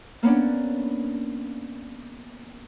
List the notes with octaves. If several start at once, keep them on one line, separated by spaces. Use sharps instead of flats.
A#3 B3 C#4 D4